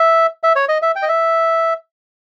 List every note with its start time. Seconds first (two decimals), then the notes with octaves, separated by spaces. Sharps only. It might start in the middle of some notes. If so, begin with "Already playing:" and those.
Already playing: E5
0.43 E5
0.56 C#5
0.69 D#5
0.82 E5
0.96 G5
1.02 D#5
1.09 E5